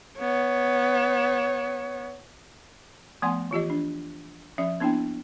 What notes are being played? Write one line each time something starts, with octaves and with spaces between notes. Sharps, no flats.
B3 C#5
F3 A3 B3 F#5 G#5 C6
E3 F4 G4 D#5
D4
F3 C#4 E5
A#3 B3 D4 E4 G5